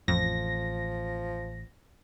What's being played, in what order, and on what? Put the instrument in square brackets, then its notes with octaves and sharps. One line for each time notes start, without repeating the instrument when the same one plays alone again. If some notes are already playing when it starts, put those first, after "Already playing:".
[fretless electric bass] A1 [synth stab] F2 [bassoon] F3 [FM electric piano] A#6